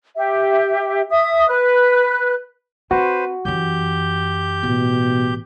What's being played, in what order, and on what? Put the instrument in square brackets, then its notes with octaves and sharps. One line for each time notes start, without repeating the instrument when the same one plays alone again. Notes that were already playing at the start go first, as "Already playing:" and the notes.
[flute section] G4 E5
E5 D#6
B4 F#6
[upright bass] C4 [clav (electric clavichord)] F#4 [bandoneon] B4 C5
[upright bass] F#2 E3 [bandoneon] G4 G6
[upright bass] A1 [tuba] B2